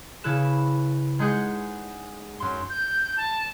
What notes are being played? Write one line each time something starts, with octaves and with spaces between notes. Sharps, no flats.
C#3 E4 A4 B4 E7
G#3 D#4 G#4 F#5 G6
F#2 C6
G6
A5